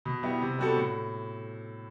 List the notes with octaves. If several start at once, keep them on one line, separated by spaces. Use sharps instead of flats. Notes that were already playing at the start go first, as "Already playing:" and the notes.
B2
G3 B3 E4
C3
G3 B3 F#4 A4
A2